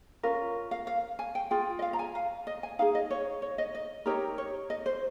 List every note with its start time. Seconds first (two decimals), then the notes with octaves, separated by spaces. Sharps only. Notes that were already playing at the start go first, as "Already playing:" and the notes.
0.23 C#4 F4 A#4
0.71 F5
0.87 F5
1.19 G#5
1.35 G5
1.51 F4 G#4 G5
1.79 D#5
1.82 F5
1.93 A#5
1.99 G#5
2.15 F5
2.47 D#5
2.63 G#5
2.79 D#4 F5
2.82 G#4
2.95 D#5
3.11 C#5
3.42 C#5
3.58 D#5
3.75 D#5
4.06 D#4 G4 A#4 C#5
4.38 C#5
4.70 D#5
4.86 C5